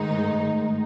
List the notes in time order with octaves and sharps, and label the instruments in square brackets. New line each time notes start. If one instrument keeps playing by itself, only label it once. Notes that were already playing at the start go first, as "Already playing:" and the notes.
Already playing: [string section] G#2 D#3 G#3 D#4 [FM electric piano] A3